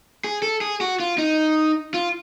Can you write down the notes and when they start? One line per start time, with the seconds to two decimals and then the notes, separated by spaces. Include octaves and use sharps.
0.24 G#4
0.42 A4
0.61 G#4
0.81 F#4
1.00 F4
1.18 D#4
1.94 F4